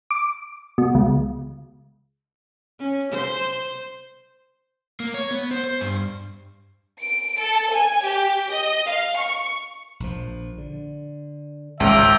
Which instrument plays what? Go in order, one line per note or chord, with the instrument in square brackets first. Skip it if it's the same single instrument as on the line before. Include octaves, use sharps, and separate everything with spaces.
[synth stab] D6
B2
C#2
[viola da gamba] C#4
C5
[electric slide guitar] A#3
C#5
B3
C5
C5
G2
[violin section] D7
A4
G#5
G4
D#5
F5
C#6
[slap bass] A#1 F3
D3
[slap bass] G#1 F3 [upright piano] C#2 [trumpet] E5 [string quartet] G5 A#5 D6